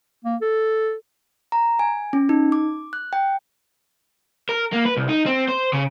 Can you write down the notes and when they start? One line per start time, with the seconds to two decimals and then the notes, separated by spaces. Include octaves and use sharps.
0.24 A#3
0.41 A4
1.52 A#5
1.79 G#5
2.13 C#4
2.29 D#4
2.52 D6
2.93 F#6
3.13 G5
4.49 A#4
4.72 A#3
4.85 B4
4.97 C2
5.09 D#4
5.26 C4
5.49 C5
5.73 C#3